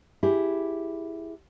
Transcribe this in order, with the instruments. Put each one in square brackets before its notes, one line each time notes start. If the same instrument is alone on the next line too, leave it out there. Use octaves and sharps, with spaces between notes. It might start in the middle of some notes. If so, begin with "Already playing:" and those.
[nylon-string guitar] E4 G4 G#4